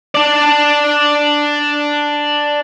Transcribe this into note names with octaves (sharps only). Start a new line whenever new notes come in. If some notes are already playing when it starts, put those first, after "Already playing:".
D4 D5